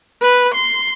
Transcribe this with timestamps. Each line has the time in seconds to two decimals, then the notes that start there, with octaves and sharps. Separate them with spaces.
0.21 B4
0.54 C6